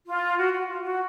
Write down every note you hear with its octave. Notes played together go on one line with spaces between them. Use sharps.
F4
F#4
F#4
F4
F#4